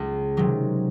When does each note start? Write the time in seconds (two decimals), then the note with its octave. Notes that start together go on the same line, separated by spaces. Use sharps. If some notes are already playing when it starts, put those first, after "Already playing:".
Already playing: C#2
0.37 C3 D#3 F#3